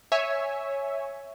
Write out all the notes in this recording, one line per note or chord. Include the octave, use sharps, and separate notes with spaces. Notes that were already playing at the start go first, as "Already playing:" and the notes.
C#5 E5 G#5